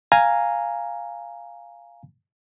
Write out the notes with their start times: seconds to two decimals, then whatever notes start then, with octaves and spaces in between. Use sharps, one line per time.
0.12 F5 G#5 A#5